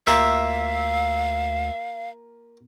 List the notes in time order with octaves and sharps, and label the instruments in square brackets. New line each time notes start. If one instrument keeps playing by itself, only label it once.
[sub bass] D2 [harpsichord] A#3 F4 G4 [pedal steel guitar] E5 [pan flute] F5